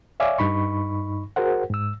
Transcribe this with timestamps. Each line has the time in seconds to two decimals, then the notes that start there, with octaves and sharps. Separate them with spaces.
0.20 C#5 D5 E5 F5 G#5 D6
0.38 G2 D#4 B5 C#6
1.36 F#4 G#4 A#4 C5 F#5
1.70 G#2 E6